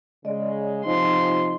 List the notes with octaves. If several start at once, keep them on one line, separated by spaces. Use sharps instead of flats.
C#3 G#3 D5 D#5
C3 F3 D#4 D#5 G#5 C6